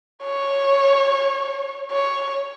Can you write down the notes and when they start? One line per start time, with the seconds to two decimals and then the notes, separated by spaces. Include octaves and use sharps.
0.25 C#5
1.92 C#5